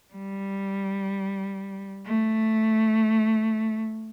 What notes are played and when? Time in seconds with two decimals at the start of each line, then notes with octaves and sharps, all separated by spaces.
0.14 G3
2.06 A3